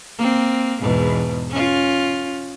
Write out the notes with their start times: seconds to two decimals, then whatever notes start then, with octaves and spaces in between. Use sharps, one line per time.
0.18 A#3 C4
0.81 E2 G#2 B2
1.51 C#4 F4